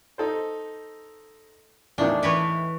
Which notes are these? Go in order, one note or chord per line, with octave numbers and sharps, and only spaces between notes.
D#4 A4 C5
E2 A2 D#3 D4
E3 B4 C#5